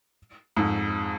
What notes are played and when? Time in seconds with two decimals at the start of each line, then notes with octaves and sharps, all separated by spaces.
0.57 F2 G#2